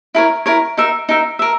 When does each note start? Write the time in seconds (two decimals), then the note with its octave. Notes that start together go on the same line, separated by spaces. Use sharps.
0.15 E4 A#4 C#5
0.46 E4 A#4 C#5
0.77 D#4 A#4 E5
1.09 D#4 A#4 E5
1.39 A#4 E5